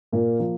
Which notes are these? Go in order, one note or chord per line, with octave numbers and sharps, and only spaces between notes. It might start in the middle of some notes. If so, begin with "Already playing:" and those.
A#2 A#3 A#4
F3 A#3 A#4